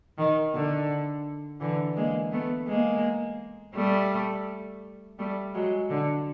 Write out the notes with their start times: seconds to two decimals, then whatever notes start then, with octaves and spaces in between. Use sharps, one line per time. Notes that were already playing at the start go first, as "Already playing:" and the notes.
0.18 D#3
0.54 D3
1.60 D3 E3
1.96 G#3 A#3
2.32 A3 B3
2.68 G#3 A#3
3.75 G3 A3
5.19 G3 A3
5.54 F#3 G#3
5.90 D3